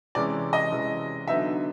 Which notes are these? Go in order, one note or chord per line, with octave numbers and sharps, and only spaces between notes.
C3 E3 G#3 C#4 D5
D#5
C3 E3 G#3 C#4
D3 F#3 B3 D#4 E5